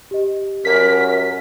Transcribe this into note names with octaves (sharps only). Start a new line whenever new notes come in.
G4 D#5
F#2 A#4 B6